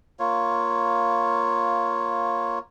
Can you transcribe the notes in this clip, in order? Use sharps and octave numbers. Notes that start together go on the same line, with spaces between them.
A#3 F4 C#5